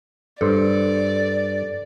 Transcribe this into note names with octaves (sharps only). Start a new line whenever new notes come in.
G2 A4 C5 D5